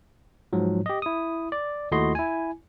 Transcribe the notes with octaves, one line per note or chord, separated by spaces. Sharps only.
G#2 F3 F#3
G4 D#5
E4 D#6
D5
D#2 A3 E4 F#4 D#5 C6
E4 G#5